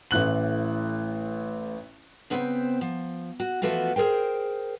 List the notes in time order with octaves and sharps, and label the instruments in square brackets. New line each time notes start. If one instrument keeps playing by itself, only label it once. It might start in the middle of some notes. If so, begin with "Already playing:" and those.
[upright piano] A1 A2 F#6 F#7
[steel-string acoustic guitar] C#3 B3 C4 C5 C#5 G5
F3
F#4
E3 F3 A3 B3 F4 F#4
G#4 A#4 C5 G5